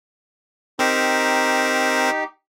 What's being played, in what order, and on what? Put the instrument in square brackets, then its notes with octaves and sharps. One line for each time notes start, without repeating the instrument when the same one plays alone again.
[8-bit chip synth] C4 A#4 C5 [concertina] D#4 G4